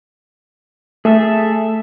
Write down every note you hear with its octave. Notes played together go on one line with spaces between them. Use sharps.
A3 G#4 A4 E5